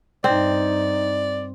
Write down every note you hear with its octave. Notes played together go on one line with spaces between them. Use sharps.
G2 C4 D#4 D5